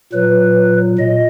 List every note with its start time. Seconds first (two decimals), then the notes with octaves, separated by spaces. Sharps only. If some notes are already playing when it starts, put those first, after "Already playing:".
0.13 A#2 F#3 B4
0.99 A#2 D#5